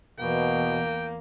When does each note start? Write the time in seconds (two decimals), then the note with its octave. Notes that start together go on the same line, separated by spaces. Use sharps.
0.20 E2 B2 A#3 G5